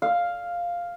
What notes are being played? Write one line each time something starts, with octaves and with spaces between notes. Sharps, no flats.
F5